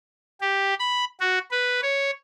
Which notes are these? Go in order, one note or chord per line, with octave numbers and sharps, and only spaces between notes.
G4
B5
F#4
B4
C#5